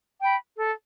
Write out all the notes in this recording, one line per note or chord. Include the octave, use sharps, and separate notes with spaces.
G5 B5
A4